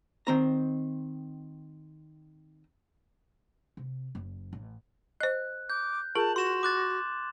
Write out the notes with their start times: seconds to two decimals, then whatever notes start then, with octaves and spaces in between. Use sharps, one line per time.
0.27 D#3 C4 A#5
3.77 C3
4.15 F#1
4.53 A1
5.21 C5 D#5 F#6
5.70 D6 G6
6.15 F4 G#4 A#4 A5 F#7
6.36 F#4 C6 E7
6.63 D6 F#6 A6